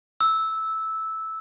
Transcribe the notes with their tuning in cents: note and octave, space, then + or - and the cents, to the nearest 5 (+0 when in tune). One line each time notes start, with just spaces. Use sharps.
E6 -10